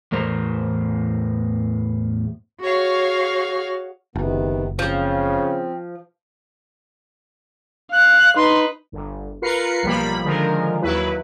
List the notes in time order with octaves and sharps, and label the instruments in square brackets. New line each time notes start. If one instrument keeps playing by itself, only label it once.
[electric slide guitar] E2 A2 A#4 C5
[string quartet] F#4 G#4 C#5 F5
[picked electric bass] F#1 [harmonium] C3 D#3 B3
[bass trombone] C#3 [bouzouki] F3 [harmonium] C4
[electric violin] F5 [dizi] F#6
[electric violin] D#4 B4 [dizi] C6
[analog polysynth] G1
F4 A#4 B4 C7 C#7
B1 F3 G3 A#3 B5
D3 D#3 F3 G#3 A#4
D#2 F#3 E4 B4